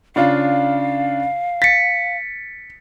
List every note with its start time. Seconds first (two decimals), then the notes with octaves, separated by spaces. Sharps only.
0.16 C#3 D4 F4 F5
1.62 A6 B6 C#7